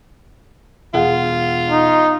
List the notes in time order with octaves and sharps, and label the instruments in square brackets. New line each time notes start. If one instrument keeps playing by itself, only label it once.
[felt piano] E1 G#4 F#5 [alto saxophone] F4
[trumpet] D#4